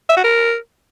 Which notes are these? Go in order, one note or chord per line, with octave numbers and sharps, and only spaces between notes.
E5
F#4
A#4